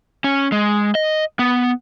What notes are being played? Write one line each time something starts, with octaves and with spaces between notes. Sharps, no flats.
C#4
G#3
D#5
B3